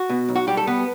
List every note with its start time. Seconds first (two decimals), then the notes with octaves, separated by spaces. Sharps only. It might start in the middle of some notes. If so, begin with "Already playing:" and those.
Already playing: F#4
0.10 B2
0.28 B1
0.36 F#4
0.47 G3 G4
0.57 A4
0.67 B3 B4